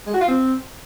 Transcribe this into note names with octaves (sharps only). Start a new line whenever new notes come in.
G#3
F#4
F4
C4